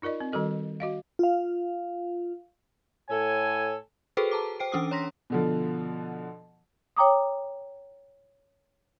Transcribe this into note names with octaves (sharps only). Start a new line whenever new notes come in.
D#4 F4 A#4 D5 D#5
C4
D#3 G3 F#4 A4 D#5
F#4 D#5 F5
F4 F5
A2 A4 C#5 G#5
F#4 G#4 A4 B4 C5 G5
A5 A#5 D6
C5 G5 C7 D7
E3 C#4 D4 D6 D#6 C7
C#5 A#5 C6 A#6 B6
B2 D3 F3
C#5 G5 A#5 D6 D#6